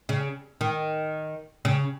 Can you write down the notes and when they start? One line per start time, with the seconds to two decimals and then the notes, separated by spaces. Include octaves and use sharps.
0.09 C#3
0.61 D#3
1.65 C#3